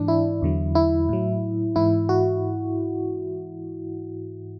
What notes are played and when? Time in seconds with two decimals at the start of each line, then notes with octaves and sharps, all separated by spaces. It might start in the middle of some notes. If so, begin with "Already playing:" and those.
Already playing: G#2 E3 D4
0.08 E4
0.42 E2 D3 F#3
0.75 E4
1.09 A2 F#3
1.76 G#2 E3 E4
2.09 F#4